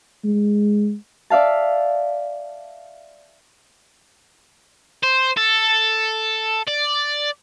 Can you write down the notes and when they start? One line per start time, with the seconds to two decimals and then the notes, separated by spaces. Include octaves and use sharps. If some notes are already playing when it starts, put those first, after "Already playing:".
0.24 G#3
1.30 D5 E5 F5 A5
5.03 C5
5.37 A4
6.67 D5